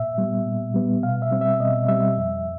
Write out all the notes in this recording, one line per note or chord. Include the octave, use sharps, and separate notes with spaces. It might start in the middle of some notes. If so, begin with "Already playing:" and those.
Already playing: A#2 E5
G3 B3
A#2
G3 B3
B2 F5
E5
G3 C4
E5
B2 D#5
G3 C4 E5
F2